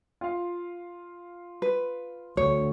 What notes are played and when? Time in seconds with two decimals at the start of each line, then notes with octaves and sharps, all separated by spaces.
0.21 F4 F5
1.62 B4
2.37 D2 C#5